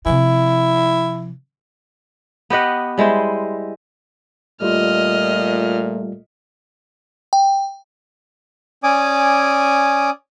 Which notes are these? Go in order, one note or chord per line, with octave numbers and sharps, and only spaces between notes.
C3 F3 E4
B3 G4 D#5 F#5
G3 G#3 E4 C5
A#2 G3 A3 F4 D#5 F6
G5
C#4 D5 G#5 D6 D#6